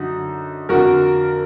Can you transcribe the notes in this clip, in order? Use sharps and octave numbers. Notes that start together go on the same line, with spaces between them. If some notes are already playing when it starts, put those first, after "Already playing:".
Already playing: F#2 D3 D#4 F#4
F2 D3 F#4 A#4